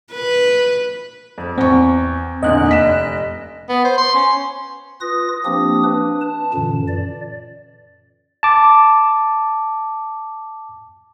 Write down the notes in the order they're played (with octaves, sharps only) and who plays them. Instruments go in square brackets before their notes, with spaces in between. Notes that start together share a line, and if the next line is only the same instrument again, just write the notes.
[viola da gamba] B4
[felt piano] F2
[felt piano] E2 C#6 [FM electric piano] C4
[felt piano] E2 A#2 D3 [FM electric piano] D#5 F#6
[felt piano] F1 B6 E7
[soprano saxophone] B3
C5
C6
C#4
[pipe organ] F4 B4 D#6 A#6
F3 A#3 C4 D4 G4 D#6
D4 B4
A5
F#2 A#2 D3 E3
D5
[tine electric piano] A5 D6